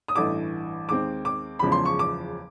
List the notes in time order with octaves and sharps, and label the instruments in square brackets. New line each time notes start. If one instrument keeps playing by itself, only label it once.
[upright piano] D#6
A1 G2 E3 A3 D6
D#2 D#3 G#3 C4 D6
D6
F#1 E2 C#3 F3 G#3 B5
C6
C#6
D6